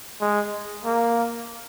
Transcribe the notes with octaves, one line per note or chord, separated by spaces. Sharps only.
G#3
A#3